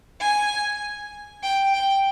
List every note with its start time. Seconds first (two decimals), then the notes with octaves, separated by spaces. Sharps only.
0.21 G#5
1.43 G5
1.74 G5